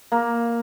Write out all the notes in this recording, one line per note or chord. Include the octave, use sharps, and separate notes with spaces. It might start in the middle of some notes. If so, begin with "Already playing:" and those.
A#3